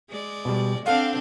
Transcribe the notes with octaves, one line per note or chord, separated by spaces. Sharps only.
G#3 D5
B2 G3
C4 D4 A4 F5 F#5